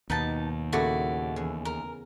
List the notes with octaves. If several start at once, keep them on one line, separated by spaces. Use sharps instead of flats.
D#2 B2 D#4 B4 A5 B5
A#2 C#3 A3 E4 F#4 D5
E2 C#4
A#4